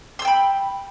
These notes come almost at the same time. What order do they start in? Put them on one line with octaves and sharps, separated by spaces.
C6 E6 G5 B5